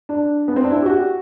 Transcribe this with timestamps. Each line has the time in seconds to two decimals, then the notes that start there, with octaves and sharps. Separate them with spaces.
0.09 D4
0.48 B3
0.56 C4
0.64 D4
0.70 E4
0.82 G4
0.86 F#4